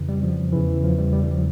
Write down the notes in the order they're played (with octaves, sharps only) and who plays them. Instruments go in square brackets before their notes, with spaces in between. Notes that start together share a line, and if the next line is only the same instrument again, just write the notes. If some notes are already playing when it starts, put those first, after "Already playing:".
Already playing: [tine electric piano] F2 C#3 E3
G3
F3
E2 C#3 E3
F3
G3
G3
E3
F3